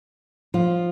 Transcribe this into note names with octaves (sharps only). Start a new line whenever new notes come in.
F3 F4